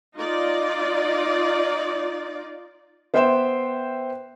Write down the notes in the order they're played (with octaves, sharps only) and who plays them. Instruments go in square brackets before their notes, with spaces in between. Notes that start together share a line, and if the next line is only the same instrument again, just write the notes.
[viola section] D#4 F4 D5
[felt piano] B3 C5 E5 G5 C6 E7